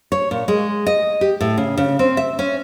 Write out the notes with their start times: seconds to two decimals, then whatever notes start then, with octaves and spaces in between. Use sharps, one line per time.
0.12 C#5
0.31 A#2
0.48 G#3
0.86 D#5
1.21 G4
1.41 A2
1.58 C#3
1.77 C#3
1.99 C4
2.17 E5
2.39 C#4